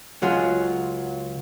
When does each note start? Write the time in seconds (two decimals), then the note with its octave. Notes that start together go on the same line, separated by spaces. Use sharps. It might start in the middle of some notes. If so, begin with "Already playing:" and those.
0.22 C#2 F#3 F4 G#4